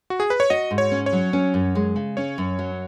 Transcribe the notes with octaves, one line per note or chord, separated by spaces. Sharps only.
F#4
G#4
B4
C#5
F#4 D#5
G#2
C#5
C#4
C#5
F#3
C#4
F#2
G#3
C#3
C#4 C#5
F#2
F#3